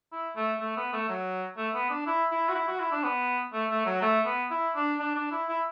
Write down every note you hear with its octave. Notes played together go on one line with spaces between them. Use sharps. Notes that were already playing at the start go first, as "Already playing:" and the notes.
E4
A3
A3
B3
A3
F#3
A3
B3
D4
E4
E4
F#4
E4
F#4
E4
D4
B3
A3
A3
F#3
A3
B3
E4
D4
D4
D4
E4
E4